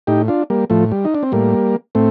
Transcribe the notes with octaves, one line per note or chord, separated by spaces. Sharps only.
A2 D#4 G4
D4 F4
G3 A#3
A2 F3 A3
G3
D#4
D4
C4
A2 G3 A#3
A2 A3 C4